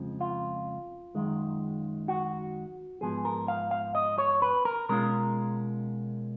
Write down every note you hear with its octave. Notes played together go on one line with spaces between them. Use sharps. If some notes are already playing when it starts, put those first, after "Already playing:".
Already playing: F2 C#3 F3 G#3
F4
F#2 D#3 G#3
F#4
G#2 F3 B3 G#4
A#4
F5
F5
D#5
C#5
B4
A#4
B2 G#3 C#4 F4 A#4